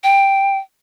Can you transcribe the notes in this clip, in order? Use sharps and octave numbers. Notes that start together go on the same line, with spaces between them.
G5